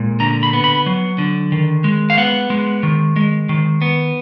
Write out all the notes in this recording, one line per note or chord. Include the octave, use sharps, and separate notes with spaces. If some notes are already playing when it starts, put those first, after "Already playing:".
Already playing: A#2 G#3
D3 A#5
B5
B3
B5
F#3
D3
D#3
G#3
F5
B3 F#5
G#3
D#3
G#3
D#3
B3